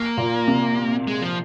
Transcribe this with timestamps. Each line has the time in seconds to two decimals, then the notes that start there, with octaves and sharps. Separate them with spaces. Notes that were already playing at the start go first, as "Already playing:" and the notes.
Already playing: A#3
0.17 A#2
0.48 C3
1.07 G#3
1.22 F3